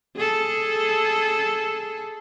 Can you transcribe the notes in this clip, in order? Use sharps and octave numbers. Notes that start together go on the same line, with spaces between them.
G#4 A4